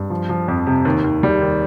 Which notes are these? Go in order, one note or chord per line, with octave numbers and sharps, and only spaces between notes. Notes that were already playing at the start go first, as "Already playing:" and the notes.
Already playing: G2
F3
F3
F2
C3
D#2
D#2
G3
D#2